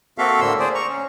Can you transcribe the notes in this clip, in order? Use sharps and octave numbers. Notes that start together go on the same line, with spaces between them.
A#3 C4 F#4 A4 E5 F5
A2 D3 A#3 C6 E6
G#4 C5 D5
A#5 C#6
C#4